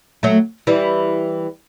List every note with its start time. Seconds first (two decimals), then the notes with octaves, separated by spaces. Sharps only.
0.23 F#3 A3
0.67 E3 G3